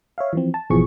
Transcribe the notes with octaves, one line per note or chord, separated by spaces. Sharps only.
C#5 E5 F5
E3 F3 C4
A5
G#1 B2 E3 F3 G#4 C#6